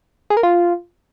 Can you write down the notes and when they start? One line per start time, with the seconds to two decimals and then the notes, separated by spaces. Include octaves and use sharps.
0.30 G#4
0.37 A#4
0.43 F4